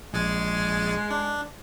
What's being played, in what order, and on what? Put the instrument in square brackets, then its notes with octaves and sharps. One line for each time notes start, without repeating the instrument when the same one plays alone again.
[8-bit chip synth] A#1 G#4 A6 [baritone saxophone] G#3
[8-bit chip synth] D4